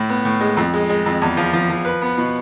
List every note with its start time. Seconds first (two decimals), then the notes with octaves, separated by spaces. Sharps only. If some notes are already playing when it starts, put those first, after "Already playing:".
Already playing: A2 E4
0.09 B3
0.25 A2
0.41 G#3
0.57 F2
0.74 G#3
0.90 G#3
1.06 F2
1.22 E2
1.37 F3
1.53 F3
1.69 F3
1.85 B4
2.02 B3
2.17 B2